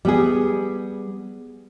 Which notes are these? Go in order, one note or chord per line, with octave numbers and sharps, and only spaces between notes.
G3 B3 G#4